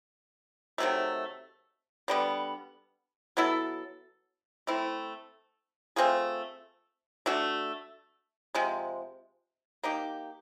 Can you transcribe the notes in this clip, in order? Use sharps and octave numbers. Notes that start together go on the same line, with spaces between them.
C3 D#3 F#3 A3
D3 G3 B3
F#3 B3 E4 A4
A3 C4 E4
A3 C4 F4 G#4
A3 D4 F#4
C3 F3 G#3
A#3 D#4 G4